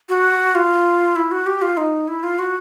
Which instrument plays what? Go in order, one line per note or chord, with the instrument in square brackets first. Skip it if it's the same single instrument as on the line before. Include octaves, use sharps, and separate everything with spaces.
[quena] F#4
F4
E4
F#4
G4
F4
D#4
E4
F4
F#4